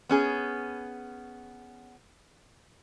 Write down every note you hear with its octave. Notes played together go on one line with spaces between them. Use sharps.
B3 C#4 G#4